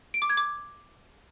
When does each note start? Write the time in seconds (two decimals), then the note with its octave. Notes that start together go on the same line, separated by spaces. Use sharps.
0.14 D7
0.22 D6
0.30 G#6
0.37 D6